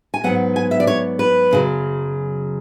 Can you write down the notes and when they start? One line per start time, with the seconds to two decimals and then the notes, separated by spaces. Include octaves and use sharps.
0.14 G#5
0.24 G#2 F#3 B3 F#5
0.56 G#5
0.71 E5
0.80 D5
0.87 C#5
1.19 B4
1.51 F#2 C#3 F#3